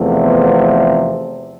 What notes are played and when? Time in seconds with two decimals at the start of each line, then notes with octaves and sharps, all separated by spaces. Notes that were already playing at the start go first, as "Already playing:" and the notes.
Already playing: E2 C3 F3 A3
0.23 B3